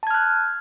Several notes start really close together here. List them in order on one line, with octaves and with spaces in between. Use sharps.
A5 G#6 F6 F#6